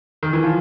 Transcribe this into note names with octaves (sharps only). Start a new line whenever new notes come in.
D#3
E3
F3